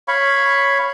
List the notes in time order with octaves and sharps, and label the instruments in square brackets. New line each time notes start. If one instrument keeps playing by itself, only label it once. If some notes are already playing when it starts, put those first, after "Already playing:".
[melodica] C#5 F5 B5 C#6